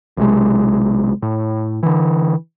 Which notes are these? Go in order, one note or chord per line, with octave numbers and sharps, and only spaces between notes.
B1 C3 G#3
A2
D3 E3